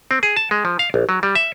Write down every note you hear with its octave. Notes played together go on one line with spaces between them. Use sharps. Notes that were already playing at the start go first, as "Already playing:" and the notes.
C4
G#4
A5
G#3
F3
F5
A#1
F#3
G3
E5